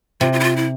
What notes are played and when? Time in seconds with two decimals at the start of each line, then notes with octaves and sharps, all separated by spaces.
0.21 C3 F4
0.33 F4
0.40 E4
0.44 F4
0.56 E4